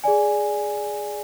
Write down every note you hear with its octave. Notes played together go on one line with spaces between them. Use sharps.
G#4 D5 G#5